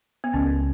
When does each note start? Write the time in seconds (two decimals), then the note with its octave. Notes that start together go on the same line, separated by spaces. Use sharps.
0.24 B3
0.34 C#2 C#4